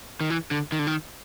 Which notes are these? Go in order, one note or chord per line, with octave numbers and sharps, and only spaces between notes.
D#3
E3
D3
D#3
D3
D#3